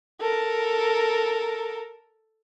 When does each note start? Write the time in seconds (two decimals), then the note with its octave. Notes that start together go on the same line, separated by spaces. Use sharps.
0.20 A4 A#4